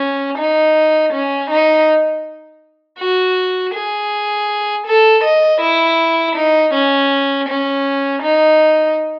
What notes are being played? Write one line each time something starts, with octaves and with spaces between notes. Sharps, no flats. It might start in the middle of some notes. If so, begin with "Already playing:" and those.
Already playing: C#4
D#4
C#4
D#4
F#4
G#4
A4
D#5
E4
D#4
C#4
C#4
D#4